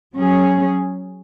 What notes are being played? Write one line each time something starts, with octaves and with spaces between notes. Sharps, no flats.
F#3 C#4 G#4